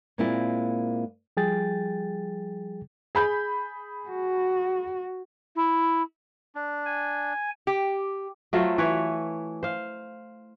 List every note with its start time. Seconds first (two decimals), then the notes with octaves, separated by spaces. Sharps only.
0.18 A#2 G#3 A#3 C4 E4 F4
1.37 F3 G3 G#4 G5 A6
3.15 G#4 B5 G6
4.09 F#4
5.56 E4
6.55 D4
6.86 G#5
7.67 G4
8.53 F#3 A3 F4 C5
8.78 E3 B4 C#5
9.63 C5 F5